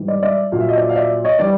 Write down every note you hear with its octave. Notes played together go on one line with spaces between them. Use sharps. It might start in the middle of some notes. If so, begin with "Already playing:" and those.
Already playing: G#2 E3 G3
D5
D5 E5
A#2 F#3 F5
E5
D#5
D5 E5
F5
D5 E5
C#5 D#5
E3 G3 D5